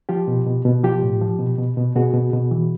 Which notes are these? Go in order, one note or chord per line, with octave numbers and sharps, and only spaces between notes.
F3 F4 G4
B2
B2
B2
F3 F4 G4
A2
F3
B2
B2
B2
B2 F#4 G#4
B2
B2
E3